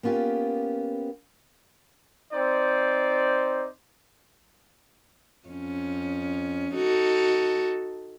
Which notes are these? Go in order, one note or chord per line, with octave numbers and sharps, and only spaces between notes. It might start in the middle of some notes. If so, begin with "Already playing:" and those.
A#3 B3 C#4 F4 G4
C4 D#4 C5 D5
F2 C#4
D#4 F#4 A4